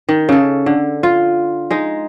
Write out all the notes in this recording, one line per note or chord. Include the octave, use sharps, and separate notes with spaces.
D#3
C#3 A4
D3
F4
G#3 D#4